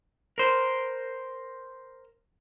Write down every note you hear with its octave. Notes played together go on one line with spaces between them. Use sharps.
A#4 C5